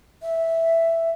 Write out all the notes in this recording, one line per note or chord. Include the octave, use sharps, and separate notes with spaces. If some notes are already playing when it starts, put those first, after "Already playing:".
E5